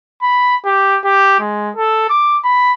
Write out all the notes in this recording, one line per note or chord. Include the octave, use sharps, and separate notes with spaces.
B5
G4
G4
G#3
A4
D6
B5